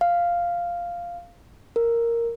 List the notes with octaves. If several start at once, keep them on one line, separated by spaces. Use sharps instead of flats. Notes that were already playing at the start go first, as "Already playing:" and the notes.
F5
A#4